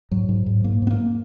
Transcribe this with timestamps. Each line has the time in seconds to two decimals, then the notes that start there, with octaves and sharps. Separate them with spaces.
0.11 G#2 F#3
0.29 G#2
0.46 G#2
0.64 G#2 A#3
0.82 G#2 B3
0.91 A#3